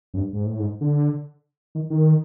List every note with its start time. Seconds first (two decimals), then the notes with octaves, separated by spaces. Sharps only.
0.14 F#2
0.17 G2
0.33 G#2
0.46 A2
0.59 G#2
0.81 D3
1.75 D#3
1.90 D#3